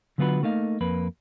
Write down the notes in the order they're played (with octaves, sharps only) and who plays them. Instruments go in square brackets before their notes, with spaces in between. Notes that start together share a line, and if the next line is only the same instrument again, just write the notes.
[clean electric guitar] D3 F#3 B3 F4 F#4 B4
A3 A#3 D#4 F5
F2 A#3 B4